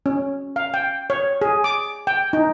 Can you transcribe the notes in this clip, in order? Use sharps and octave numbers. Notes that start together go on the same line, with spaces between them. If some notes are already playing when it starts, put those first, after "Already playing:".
C#4
F5
G5
C#5
G#4
D6
G5
D#4